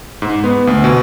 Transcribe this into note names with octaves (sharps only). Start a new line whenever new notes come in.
G#2
B3
D2
B2